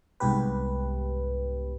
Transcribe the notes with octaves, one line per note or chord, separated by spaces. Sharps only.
C2 G#2 B3 G4 B4